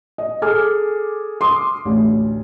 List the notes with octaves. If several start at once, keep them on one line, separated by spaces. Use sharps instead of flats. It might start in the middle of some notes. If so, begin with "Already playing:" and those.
D#5
G#4 A4 G#5 D6 F6
C6 D6 D#6
A1 D2